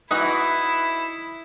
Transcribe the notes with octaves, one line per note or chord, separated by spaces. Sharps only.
E3 D#4 E4 F#4 B4